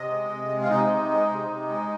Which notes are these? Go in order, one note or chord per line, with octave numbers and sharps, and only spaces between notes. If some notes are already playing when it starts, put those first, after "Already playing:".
Already playing: C3 D#5
G#3
C3
G#3
F4
C3 D#4
C3
G#3
C3
C3
G#3